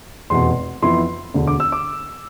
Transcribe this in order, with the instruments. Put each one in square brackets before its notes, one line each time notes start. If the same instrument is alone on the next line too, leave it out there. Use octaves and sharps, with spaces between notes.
[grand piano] F1 E2 B2 C6
F2 E3 B3 E4 C6
E1 D2 D3
D6
E6
D6